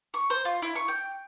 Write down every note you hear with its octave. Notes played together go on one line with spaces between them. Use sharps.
C#6
C5
F4
E4
C#6
G5